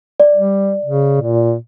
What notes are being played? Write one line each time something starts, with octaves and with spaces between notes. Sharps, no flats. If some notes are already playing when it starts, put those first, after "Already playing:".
D5
G3
C#3
A#2